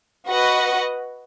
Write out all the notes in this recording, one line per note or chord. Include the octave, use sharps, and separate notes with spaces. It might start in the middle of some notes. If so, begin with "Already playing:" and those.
F#4 B4 D#5 F#5